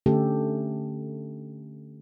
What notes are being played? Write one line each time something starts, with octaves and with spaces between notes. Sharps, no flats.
D3 A3 C#4 G4 A4